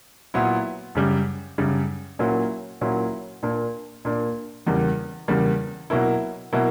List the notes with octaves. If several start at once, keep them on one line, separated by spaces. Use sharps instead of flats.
A#2 F#3 B3 E4
F#2 C#3 G3
F#2 C#3 G3
A#2 F#3 A#3 C#4 E4
A#2 F#3 A#3 C#4 E4
A#2 A#3 D4
A#2 A#3 D4
E2 C#3 G3 A#3
E2 C#3 G3 A#3
B2 F#3 A#3 E4
B2 F#3 A#3 E4